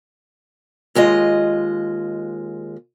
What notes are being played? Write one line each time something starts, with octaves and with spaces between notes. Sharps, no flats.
D#2 G#3 F4 D#5